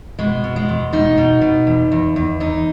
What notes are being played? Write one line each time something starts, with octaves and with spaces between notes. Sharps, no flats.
B2 G#3
B2
G#3
E2
B2 D#4
B2
B2
E2
E2
E2
E2 D#4